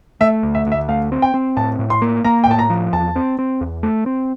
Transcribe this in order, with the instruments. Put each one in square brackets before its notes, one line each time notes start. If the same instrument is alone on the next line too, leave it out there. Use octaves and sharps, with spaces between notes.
[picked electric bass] A3 [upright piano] E5
[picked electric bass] D2
[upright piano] E5
[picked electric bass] D2
[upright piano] E5
[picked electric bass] A3 [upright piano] F5
[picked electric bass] C4
[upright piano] G5
[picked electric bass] C4
[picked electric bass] A2 [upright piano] A5
[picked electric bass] A2
[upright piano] C6
[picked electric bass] A#3
[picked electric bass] A#3 [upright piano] A#5
[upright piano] G5
[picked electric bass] A2 [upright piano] A5
[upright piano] A#5
[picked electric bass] F3
[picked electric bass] E2 [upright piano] A5
[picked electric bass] C4
C4
E2
A3
C4